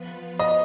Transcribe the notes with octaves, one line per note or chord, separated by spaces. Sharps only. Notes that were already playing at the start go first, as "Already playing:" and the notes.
Already playing: F3 B3 F4 B4
D#5